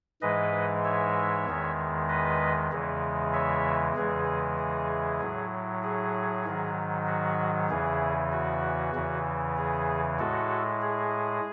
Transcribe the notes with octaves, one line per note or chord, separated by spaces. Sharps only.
G#2 E3 G#3 B4 D#5
C#5 E5
E2 D#3 G#3
B4 D#5
E2 C#3 E3 G#3
C#5 E5
E2 C#3 E3 G#3 G#4
G#4
A2 F#3
G#4
G#2 D#3 F#3
F#4
E2 C#3 E3 G#4
F#4
E2 C#3 E3
G#4
A2 G#3 F#4 A4
G#4